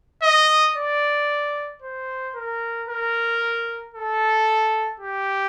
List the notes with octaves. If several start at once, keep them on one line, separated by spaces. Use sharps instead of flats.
D#5
D5
C5
A#4
A#4
A4
G4